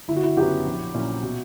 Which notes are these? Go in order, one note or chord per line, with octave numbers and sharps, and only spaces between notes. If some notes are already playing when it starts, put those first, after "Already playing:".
G1 E4
F#4
E4
F#2 C#3 F#3 B3 G4
A#1
A#2 F#3 C#4 E4
B2